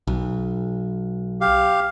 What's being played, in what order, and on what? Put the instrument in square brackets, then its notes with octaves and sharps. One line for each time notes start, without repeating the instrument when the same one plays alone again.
[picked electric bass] B1
[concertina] G4 F5